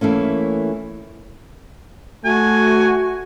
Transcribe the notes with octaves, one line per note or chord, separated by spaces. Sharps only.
E3 A3 A#3 C#4
A3 F#4 G#5